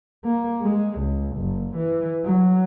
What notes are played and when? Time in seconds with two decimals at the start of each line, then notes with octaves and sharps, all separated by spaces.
0.24 A#3
0.61 G#3
0.99 C#2
1.37 F#1
1.76 E3
2.24 F#3